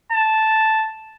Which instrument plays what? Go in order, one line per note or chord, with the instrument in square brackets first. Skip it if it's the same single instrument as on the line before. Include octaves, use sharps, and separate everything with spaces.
[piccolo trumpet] A5